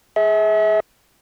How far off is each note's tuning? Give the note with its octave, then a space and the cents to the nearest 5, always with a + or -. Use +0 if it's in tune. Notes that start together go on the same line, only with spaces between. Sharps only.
G#4 +10 E5 -35